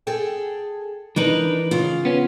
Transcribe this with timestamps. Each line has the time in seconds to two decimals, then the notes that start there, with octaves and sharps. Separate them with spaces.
0.07 G#4 A4 G5
1.16 E3 D4 D#4 A#4 B4
1.71 C#3 F4
2.05 B3 C#4